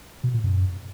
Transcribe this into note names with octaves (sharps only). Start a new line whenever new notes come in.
B2
A#2
F#2